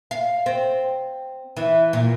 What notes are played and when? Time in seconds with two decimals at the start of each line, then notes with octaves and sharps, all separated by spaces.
0.11 F5
0.46 C4
1.57 E3
1.93 A#2